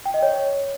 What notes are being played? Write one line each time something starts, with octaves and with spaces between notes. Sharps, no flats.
G5
D#5
C#5